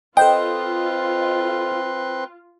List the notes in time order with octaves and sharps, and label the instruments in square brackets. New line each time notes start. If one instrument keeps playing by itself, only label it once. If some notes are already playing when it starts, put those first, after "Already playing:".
[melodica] C4 B4 C6 [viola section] F4 [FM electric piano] A4 C5 D#5 [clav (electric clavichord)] G5